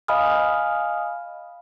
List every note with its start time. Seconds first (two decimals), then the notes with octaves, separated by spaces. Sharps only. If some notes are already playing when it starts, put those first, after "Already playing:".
0.08 D#5 F5 G#5 B5 D#6 F6